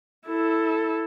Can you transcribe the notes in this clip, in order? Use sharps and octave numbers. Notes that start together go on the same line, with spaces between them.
E4 A4